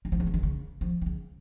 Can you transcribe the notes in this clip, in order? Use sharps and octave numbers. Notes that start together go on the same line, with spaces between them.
D#3
F3
D#3
F3
D#3
C#3
F3
D#3
C#3